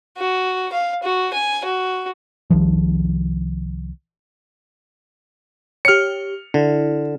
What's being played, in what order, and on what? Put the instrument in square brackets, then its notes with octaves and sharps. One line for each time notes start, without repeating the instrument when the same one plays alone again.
[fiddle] F#4
F5
F#4
G#5
F#4
[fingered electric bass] C2 D#3 F3
[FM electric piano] G4 C#5 [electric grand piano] F6 C#7
[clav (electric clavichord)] D3 [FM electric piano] E4